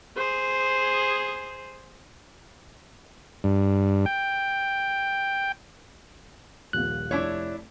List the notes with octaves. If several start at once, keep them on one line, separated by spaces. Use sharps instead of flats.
G#4 C5
G2
G5
D#1 A#1 A#3 F#6
F1 D4 E4 C#5